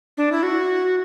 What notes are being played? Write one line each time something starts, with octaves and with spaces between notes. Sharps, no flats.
D4
E4
F#4